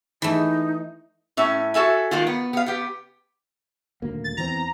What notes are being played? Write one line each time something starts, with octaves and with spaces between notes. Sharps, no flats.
E3 A3 D#4
A2 C#4 E5
F#4 A4 E5 G#5
D#3 G#3 A#3 F4
B3
B3 F5
B3 G4
D#1 D2 A#3
A6
E2 E3 C4 A#5